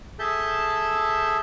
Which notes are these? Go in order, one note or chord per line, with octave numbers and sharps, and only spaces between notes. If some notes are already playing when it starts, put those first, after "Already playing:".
G#4 A4 E5 A5 G6